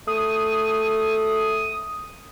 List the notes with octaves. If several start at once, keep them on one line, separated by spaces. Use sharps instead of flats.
A3 D#6